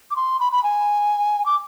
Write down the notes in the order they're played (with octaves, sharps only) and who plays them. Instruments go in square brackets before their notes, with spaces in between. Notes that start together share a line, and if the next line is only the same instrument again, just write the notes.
[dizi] D6
C6
B5
B5
G#5
D6